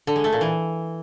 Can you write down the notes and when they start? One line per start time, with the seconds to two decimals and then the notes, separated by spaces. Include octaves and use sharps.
0.07 D3
0.16 G#3
0.24 A3
0.33 A#2
0.41 E3